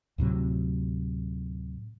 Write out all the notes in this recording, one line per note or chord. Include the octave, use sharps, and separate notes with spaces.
D2 A2 C3 F#3